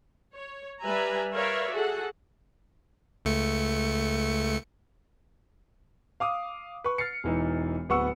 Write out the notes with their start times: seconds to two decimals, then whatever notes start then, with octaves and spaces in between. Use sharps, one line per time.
0.35 C#5
0.81 G3 B4 E5 G#5 A#5
1.33 A#4 B4 C#5 D5 E5 F5
1.72 F#4 G#4 A4 F#5
3.25 C#2 A3 C#7
6.20 F5 D6 D#6
6.84 B4 C#6
6.98 F6 A6 C7 C#7
7.24 E1 E3 D#4
7.89 D1 B3 F#5 C#6 E6 C#7